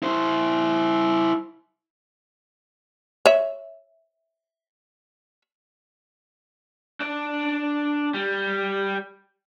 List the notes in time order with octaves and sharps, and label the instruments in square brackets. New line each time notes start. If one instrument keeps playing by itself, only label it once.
[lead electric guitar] E4 C5
[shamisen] C#5 E5
[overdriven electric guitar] D4 D5
G3